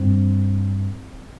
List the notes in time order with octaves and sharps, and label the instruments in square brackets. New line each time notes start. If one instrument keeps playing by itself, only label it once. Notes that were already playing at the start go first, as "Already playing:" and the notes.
Already playing: [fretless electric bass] G2 C4